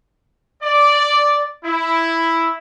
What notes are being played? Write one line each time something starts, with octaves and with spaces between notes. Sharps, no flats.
D5
E4